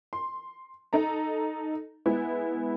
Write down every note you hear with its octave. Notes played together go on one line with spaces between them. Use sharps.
C6
D#4 A4 A#5
G#3 B3 E4